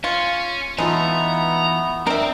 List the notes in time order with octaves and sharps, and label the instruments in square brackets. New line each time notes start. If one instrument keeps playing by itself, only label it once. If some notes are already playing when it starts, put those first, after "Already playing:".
[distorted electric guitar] C#4 [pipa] F4
[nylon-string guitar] E3 D#4 F4 [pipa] G#3 A3 [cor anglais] B3 [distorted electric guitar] A#5
[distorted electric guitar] C4 [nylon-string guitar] D4 [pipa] A#4 E5